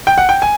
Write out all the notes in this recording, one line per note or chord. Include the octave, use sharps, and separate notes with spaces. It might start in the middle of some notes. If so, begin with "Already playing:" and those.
G5
F#5
G5
G#5